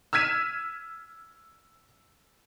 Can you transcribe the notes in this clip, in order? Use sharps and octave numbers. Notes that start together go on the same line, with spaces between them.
E6 F6 G#6 B6 D#7 E7